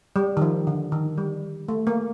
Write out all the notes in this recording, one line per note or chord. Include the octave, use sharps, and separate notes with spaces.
G3
D#3
F3
D3
D#3
G3
A3
A#3